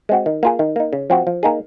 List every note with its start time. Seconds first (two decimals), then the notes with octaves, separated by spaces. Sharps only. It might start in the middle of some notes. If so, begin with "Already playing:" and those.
0.09 G#3 C4 F#4
0.26 D#3
0.43 A#3 F4 G#4
0.59 D#3
0.76 A#3 D#4
0.93 C#3
1.10 F3 C4 F#4
1.27 F3
1.43 A#3 D#4 G#4